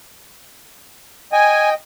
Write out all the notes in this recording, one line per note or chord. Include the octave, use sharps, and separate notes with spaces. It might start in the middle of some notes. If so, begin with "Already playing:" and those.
D#5 G5 G#5